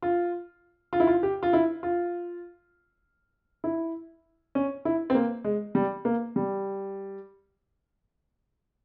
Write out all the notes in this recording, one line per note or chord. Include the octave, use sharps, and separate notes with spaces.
F4
F4
E4
F4
G4
F4
E4
F4
E4
C#4
E4
C4
A#3
G#3
G3
A#3
G3